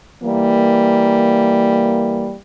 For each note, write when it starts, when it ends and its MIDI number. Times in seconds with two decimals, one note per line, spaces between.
0.23 2.35 52
0.23 2.35 55
0.23 2.35 58